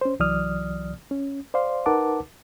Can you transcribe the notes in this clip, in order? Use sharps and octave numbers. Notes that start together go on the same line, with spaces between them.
C#4 C5
C2 E3 F#3 D5 D#6 F6
C#4
C5 D5 F5 C6
D#4 A#4 B4 F#5 A5 D6